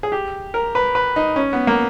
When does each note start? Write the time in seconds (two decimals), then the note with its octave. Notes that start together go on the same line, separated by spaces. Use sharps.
0.03 G#4
0.12 G4
0.54 A#4
0.75 B4
0.95 B4
1.16 D#4
1.36 C#4
1.53 B3
1.67 A#3